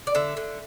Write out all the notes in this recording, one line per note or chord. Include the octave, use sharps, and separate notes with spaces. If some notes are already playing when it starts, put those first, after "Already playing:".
D5
D3 E5
D3